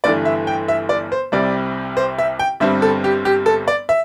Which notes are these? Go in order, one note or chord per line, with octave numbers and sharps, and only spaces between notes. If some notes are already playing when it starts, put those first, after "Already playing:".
G1 G2 E3 A3 D5
E5
G5
E5
D5
C5
C2 C3 G3 C4 D5
C5
E5
G5
G1 G2 G3 C4 E5
A4
G4
G4
A4
D5
E5